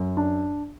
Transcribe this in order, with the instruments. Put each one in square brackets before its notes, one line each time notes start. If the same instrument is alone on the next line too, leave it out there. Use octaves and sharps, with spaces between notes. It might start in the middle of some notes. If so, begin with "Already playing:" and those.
Already playing: [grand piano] F#2
D4